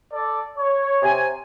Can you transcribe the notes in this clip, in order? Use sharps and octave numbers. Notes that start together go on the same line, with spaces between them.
A4 D5
C#5
C3 G#5